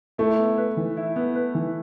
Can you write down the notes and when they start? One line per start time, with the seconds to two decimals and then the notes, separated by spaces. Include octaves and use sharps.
0.18 A3 E4
0.39 B3
0.58 B4
0.77 E3
0.97 E4
1.16 B3
1.35 B4
1.55 E3